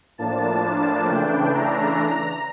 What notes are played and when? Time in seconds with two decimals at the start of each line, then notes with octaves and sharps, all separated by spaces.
0.18 A2 F3 A#3 D4 A5
0.63 A5
1.08 C#3 E3 A3 D4 G5
1.54 A#5